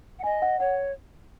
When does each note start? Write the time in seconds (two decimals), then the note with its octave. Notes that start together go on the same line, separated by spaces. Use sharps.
0.19 F#5
0.24 D#5 G#5
0.42 F#5
0.60 C#5 F#5